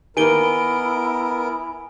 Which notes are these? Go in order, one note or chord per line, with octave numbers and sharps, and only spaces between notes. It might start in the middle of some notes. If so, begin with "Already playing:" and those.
D#3 A#3 B3 E4 A#4 G#5 D7 G7